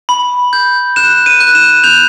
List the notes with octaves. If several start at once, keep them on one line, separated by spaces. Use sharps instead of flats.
B5
G6
F#6 E7
D#7
F#6
E7
G6 F7